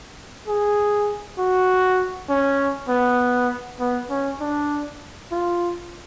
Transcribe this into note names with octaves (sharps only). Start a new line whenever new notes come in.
G#4
F#4
C#4
B3
B3
C#4
D4
F4